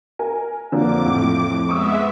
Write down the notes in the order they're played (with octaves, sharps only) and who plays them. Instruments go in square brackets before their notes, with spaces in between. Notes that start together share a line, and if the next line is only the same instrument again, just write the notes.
[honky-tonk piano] A#4 G#5
[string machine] F2 D6 [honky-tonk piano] D3 F3 A#3
[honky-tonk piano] A2
[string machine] G#3 B3 E5 [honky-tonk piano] C#6 D#6 E6